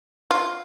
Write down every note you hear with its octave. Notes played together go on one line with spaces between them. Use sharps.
F4